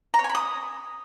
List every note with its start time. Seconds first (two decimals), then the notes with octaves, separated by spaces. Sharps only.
0.14 A#5
0.19 C#5
0.24 G#5
0.29 B5
0.35 D#6